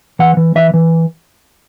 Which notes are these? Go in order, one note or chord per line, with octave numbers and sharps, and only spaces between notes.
E3 F#5
E3
E3 E5
E3